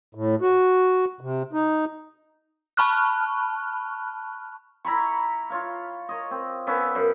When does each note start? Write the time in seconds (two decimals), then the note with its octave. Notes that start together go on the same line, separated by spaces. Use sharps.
0.15 A2
0.41 F#4
1.21 C3
1.53 D#4
2.77 A5 B5 C#6 F6 F#6
4.85 E4 A#5 B5 C#6
5.50 F4 C#5 F5
6.09 C#5 D#5
6.31 C4
6.67 B3 C#4 E5 F5
6.95 F#2